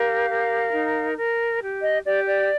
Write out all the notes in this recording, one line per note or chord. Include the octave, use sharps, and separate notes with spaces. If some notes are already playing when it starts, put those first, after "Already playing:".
Already playing: G4 A#4 F5
A#4
D#4
A#4
G4
D#5
G4 D5
D5